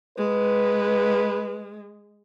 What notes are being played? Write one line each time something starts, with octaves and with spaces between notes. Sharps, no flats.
G#3 B4